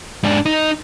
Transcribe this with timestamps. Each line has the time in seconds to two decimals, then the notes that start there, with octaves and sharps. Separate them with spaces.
0.23 G#2 D4
0.46 D#4